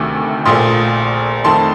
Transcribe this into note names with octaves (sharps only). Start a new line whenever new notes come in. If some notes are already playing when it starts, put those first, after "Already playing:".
Already playing: D2 C3 D#3 A3 D6
A#1 A#2 A3 C6 D#6
F2 D#3 A3 A5 C6